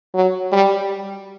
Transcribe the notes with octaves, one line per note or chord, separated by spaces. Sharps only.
F#3
G3